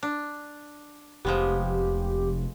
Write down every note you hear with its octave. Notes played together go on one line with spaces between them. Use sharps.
D4
F1 F3 G#3 B3 G4